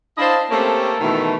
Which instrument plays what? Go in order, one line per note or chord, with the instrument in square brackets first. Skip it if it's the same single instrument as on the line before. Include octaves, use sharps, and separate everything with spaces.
[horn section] D4 E4 C5 D#5 F5 A5
A3 A#3 C4 C#4 G4 A4
B2 D#3 E3 A3